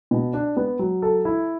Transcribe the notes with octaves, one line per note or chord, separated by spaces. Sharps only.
B2
D4
B3
F#3
A4
E4